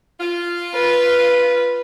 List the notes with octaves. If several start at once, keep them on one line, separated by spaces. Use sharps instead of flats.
F4
B4